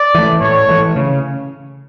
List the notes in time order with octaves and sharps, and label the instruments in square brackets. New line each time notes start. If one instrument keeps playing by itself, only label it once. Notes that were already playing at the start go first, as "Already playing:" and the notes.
Already playing: [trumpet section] D5
[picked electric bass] E3 A3
[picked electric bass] A2 [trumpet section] C#5
[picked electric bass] E3 A3
C#3